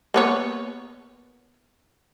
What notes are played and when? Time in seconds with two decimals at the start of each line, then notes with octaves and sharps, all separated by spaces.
0.14 A#3 B3 C#5